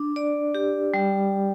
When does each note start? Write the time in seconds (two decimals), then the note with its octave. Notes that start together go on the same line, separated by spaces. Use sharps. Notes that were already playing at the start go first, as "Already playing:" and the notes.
Already playing: D4
0.16 D5
0.55 G4
0.94 G3